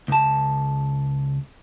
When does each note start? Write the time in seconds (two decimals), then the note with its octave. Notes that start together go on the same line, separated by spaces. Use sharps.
0.08 C#2 A5